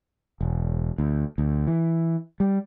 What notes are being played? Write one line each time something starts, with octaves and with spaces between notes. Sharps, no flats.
E1
D2
D2
E3
G3